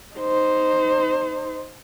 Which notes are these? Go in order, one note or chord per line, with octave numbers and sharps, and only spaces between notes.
D#4 C5